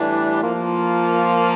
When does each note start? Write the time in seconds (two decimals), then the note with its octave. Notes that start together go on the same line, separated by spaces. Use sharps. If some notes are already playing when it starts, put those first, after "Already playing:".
Already playing: A2 E3 G3 D4
0.42 F3 A#3 F4